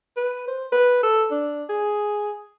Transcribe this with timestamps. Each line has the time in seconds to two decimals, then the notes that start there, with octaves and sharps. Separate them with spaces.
0.17 B4
0.48 C5
0.72 B4
1.03 A4
1.31 D4
1.69 G#4